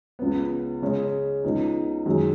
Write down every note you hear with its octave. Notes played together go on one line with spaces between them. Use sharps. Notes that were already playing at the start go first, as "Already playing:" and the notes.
C#2 C#3 B3
C#3 G#3 C#4
C#2 C#3 B3 D#4
F#2 D#3 G#3 C#4 G#4